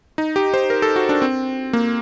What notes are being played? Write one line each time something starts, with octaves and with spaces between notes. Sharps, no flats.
D#4
G4
C5
A#4
A4
F#4
D4
C4
A#3